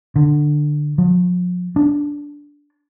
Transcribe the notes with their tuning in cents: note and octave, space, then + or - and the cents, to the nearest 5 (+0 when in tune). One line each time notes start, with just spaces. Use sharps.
D3 +15
F3 +45
D4 -10